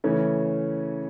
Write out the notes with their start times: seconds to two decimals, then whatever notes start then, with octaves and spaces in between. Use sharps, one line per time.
0.04 C#3 E3 A3 C#4